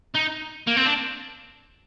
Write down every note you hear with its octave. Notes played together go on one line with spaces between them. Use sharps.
D#4
A#3
C4
D4